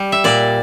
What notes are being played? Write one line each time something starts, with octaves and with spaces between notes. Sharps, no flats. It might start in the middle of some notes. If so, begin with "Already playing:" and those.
Already playing: G3
E5
A#2 D5